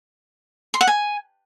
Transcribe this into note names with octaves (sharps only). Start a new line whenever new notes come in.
C6
F#5
G#5